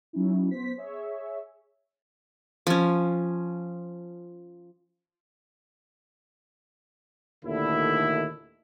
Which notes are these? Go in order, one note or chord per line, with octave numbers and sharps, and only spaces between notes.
F#3 C#4 D#4 E4
B3 C5 B6
G#4 C#5 E5
F3 C#4
D#2 A#2 D3 D#3 A3 E4